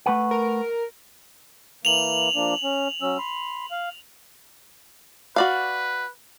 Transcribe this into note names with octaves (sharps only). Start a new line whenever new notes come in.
A3 B4 F#5
A#4
E3 A#3 F7 F#7
F3 A#3 D4
C#4
F#3 C#4 E6
B5 C6
F5
F#4 B4 D5 F5